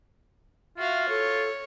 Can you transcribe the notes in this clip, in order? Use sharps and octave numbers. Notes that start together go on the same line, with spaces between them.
F4 F#4 E5 F5
A4 C#5